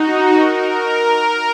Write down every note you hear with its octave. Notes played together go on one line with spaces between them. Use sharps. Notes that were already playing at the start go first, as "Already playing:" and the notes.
Already playing: D#4 F#4
A#4